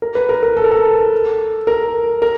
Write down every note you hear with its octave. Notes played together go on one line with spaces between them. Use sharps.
A#4
B4
A#4
A#4
A4
A#4
A4
A#4
A#4